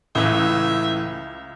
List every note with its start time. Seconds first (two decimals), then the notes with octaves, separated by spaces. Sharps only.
0.15 C#2 A2 E3 E5